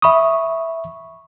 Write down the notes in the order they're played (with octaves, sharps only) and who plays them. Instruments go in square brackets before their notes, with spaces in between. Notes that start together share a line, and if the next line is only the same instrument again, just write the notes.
[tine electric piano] E5 D#6 [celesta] B5 C#6